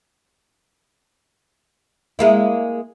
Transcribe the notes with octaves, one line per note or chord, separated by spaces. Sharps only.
G#3 A#3 E4